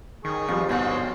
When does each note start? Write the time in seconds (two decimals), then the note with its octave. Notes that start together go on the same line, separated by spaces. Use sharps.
0.25 D#3 G#4 C#6
0.49 F2 F3 G3 F4
0.69 G1 B2 C4 C#4 D#4 F4 F#4